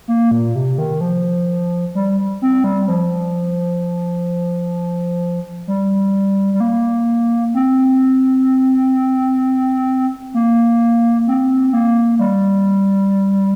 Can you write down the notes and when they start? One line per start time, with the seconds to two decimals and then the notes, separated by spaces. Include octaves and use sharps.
0.08 A#3
0.31 A#2
0.55 C3
0.78 D#3
1.01 F3
1.95 G3
2.42 C4
2.64 G3
2.88 F3
5.67 G3
6.54 G3
6.60 A#3
7.54 C4
10.34 A#3
11.27 C4
11.73 A#3
12.19 G3